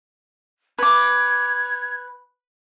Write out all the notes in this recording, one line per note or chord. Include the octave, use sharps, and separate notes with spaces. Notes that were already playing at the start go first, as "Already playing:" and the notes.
B4 D6 G#6